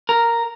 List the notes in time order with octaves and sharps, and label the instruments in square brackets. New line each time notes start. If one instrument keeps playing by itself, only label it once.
[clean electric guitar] A#4